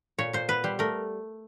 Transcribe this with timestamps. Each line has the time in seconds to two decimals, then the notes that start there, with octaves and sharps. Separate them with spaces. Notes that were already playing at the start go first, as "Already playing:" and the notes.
0.18 A#2 C#5
0.33 A#2 C5
0.49 B3 B4
0.64 G3 C5
0.79 A3 A#4